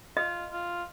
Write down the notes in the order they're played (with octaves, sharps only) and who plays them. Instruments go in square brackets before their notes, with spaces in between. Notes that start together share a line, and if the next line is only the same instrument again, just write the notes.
[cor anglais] F4 [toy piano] D#5
[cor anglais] F4